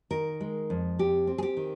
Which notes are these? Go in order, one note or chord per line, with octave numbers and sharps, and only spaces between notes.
D#3 A#4
G#3
F2
C4 G4
C4
G#4
G4
D#3